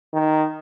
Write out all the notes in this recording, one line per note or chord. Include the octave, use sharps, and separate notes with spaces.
D#3